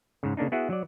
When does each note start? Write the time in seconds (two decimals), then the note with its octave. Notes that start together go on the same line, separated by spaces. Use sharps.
0.23 G#2 C#3
0.37 C#3 A#3 D4 D#4
0.52 B3 E4 F#4 G#4 E5 F#5
0.70 F#3 D5